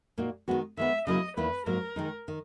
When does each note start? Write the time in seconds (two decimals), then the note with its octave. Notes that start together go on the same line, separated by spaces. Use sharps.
0.18 A#2 A#3 D#4 F#4
0.48 D#3 G#3 B3 F#4
0.77 D#3 G#3 B3 E5
1.07 C#3 F#3 A#3 E4 D#5
1.37 E2 D#3 A#3 E4 B4
1.66 G#2 F#3 A#3 A#4
1.96 D#3 G#3 D#4
2.28 D#3